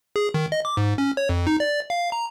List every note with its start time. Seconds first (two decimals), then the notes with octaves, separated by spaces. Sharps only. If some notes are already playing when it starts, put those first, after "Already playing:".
0.16 G#4
0.34 D#3
0.52 D#5
0.65 D6
0.77 G#2
0.98 C#4
1.17 C#5
1.29 F2
1.47 D#4
1.60 D5
1.90 F5
2.12 A#5